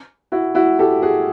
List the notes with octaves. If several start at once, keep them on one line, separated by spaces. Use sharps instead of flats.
E4 F#4
E4 F#4
G4 A4
F#4 G#4